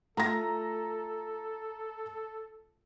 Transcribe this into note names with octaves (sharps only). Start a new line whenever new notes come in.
A3 F4 A4 A#5 A#6